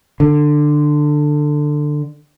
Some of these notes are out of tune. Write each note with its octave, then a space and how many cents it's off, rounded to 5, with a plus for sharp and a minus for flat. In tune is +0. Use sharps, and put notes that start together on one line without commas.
D3 +15